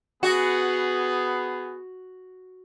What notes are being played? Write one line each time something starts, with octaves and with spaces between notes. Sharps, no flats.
B3 F#4 G#4